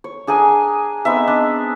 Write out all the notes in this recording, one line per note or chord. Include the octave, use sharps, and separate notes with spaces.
C#5
D4 G#4 A#4 G#5
B3 C4 D#4 E5
D4